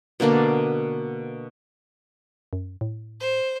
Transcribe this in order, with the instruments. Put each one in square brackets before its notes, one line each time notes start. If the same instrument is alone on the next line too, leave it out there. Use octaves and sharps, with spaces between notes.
[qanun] B2 D3 A#3 D4
[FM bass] F#2
A2
[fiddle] C5